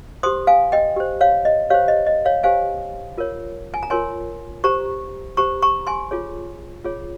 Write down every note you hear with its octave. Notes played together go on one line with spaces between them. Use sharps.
G4 C5 C6 D#6
F5 G#5
D#5 G5
G4 C5
C#5 F5
D#5
G4 C5 C#5 F5
D#5
D#5
C#5 F5
G4 C5 F5 G#5
F4 A#4 C#5
G#5
A#5
F4 A#4 C#5 G#5 C6
G4 C5 A#5 C#6
G4 C5 A#5 C#6
A#5 C#6
G#5 C6
F4 G#4 C#5
F4 G#4 C#5